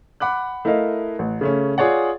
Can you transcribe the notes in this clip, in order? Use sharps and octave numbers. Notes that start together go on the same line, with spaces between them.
F#5 B5 D6 F#6
A3 E4 A#4 D#5 F5
A1
C#3 A3 C#4
F4 G#4 C#5 D5 F#5